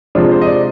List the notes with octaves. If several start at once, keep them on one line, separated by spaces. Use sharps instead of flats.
C3 F3 G#3 D4 F4
C5
D#5
D5